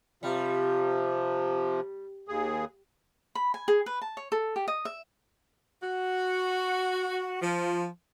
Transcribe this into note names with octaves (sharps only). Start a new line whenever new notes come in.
C3 F3 G3
D#2 G#4
B5
G#5
G#4
B4
A5
C#5
A4
G4
D#5
E5
F#4
F3